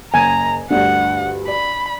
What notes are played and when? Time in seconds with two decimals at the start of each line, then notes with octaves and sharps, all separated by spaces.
0.14 F#1 G#5 A#5
0.71 D2 G2 D4 F#5
1.48 D5 B5